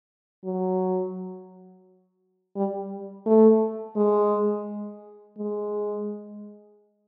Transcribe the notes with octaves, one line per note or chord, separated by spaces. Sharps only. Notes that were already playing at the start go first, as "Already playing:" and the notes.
F#3
G3
A3
G#3
G#3